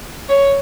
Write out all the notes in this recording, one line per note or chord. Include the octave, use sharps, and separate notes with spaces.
C#5